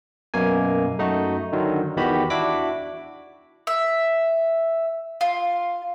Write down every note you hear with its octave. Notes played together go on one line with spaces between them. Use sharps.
F#2 B2 A#3 G#5
F#2 A3 D#4 F#4
D3 D#3 F#3
E2 D#3 B3 F#4 G4 B5
D4 E4 F#4 B5 D6 B6
E5
F4